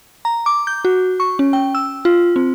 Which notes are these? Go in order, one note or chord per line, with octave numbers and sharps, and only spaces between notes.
A#5
D6
G6
F#4
C#6
C#4
G5
E6
F4
C4